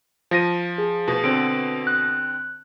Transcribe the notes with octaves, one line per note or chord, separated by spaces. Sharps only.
F3 A#6 D#7
G#4
B2
D3 C4 D7
F#6